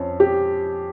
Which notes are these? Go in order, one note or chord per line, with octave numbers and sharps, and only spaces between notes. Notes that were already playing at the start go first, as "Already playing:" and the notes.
Already playing: F2 C#4
G4